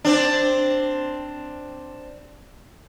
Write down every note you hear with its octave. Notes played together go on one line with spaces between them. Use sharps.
C4 D4